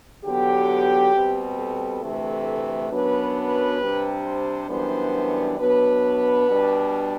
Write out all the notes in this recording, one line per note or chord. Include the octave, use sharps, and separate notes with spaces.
E2 D3 F#3 B3 G4
B2 G3 C4
A4
D2 C3 E3 A3
F#2 F#3 B3 D4 B4
B4
C3 G3 D4
C5
F#2 E3 G3 B3 D4 C5
B2 F#3 B3 D4 B4
B2 G3 D4